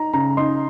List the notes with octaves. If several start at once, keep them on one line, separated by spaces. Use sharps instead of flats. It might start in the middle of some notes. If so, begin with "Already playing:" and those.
Already playing: D#4 A#5
C#3 A#5
D#4 C6